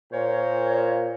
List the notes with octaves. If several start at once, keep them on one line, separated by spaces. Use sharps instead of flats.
A#2 A#4 C5 C#5